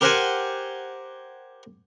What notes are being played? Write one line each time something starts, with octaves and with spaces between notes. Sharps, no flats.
G4 A#4 C5 F#5 G#5